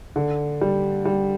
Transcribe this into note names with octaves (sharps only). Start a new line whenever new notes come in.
D3
G3
G3